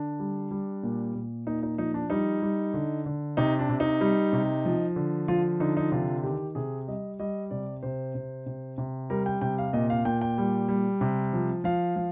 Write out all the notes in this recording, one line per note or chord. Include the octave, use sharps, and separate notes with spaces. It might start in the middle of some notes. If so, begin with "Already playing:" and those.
Already playing: D3 D4
G3
G3
A#2
A#2
A#2 D#4
D#4
F3 D#4
D4
G3 D#4
G3
D3
D3
C3 D#4
D4
C3
D#4
G3
C3
F3
D3
F3 F4
D3 D#4
D#4
C3 F4
D#3 G4
C3 G#4
G3 D#5
G3 D#5
C3 D5
C3 C5
C3
C3
C3
G3 A#4
G5
C3 G5
F5
A#2 D#5
F5
A#2 G5
G5
G3
G3
C3
F3
F3 F5
F3